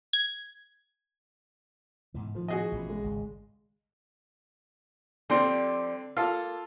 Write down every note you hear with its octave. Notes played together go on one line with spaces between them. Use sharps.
G#6
G#2 B2 E3
A2 D#3 F3
F#4 G#4 D#5
A1 B2 C#4
G#3
G#1 C#2
D3 F3 G3 C4 C6
A#3 F4 A4